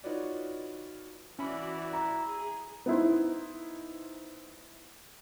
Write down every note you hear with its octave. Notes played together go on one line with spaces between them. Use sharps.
D#4 F4 F#4 B4 C#5 D5
E3 C#4 E4 F#4 D5 B5
A#5
G#4
B3 D#4 E4 C5